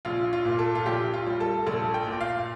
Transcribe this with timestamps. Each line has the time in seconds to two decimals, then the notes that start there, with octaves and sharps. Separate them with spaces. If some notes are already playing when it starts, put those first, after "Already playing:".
0.05 A#1 F4
0.33 F4
0.45 A#2
0.59 A4
0.75 F4
0.86 A#1 G4
1.14 F4
1.26 G3
1.40 A4
1.67 A#1 A4
1.94 G5
2.07 A#2
2.21 F5